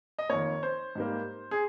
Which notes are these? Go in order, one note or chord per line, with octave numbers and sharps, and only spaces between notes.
D#5
F2 D#3 A#3 C#5
C5
G#2 G3 A#3
G#4